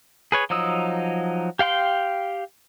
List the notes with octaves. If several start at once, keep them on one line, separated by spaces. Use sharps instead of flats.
G#4 B4 C#5
F3 F#3 D#4 D#6 E6
G4 F5 G5 C6